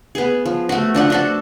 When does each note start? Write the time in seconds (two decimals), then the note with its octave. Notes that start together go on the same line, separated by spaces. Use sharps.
0.15 B3 G#4
0.46 F3
0.69 A3 F#4
0.95 F3 D4 F#5
1.10 D4 F#4 A4